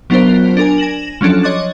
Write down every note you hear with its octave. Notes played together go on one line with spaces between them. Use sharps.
F#3 B3 D4 F4 A#4 C5
D4 A#4 G#5
G#5 A#6 E7 F#7
F3 F#3 C#4 D4 A4
C#5 D#5 C6 D6 F#6 A6